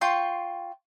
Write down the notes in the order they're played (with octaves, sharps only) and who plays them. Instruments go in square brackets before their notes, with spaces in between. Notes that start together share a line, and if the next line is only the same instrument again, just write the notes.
[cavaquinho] F4 G5 C6 C#6